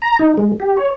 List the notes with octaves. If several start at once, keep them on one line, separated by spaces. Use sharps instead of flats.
A#5
D#4
G#3
G4
C#5